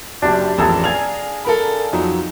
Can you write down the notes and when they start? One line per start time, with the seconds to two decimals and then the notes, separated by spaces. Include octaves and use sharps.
0.22 F#1 F#2 D4 G4
0.58 A1 F2 G#4 A4 A#5
0.84 F5 G#5 G#6 F7
1.45 A4 A#4 B5
1.93 F2 F#3 D#4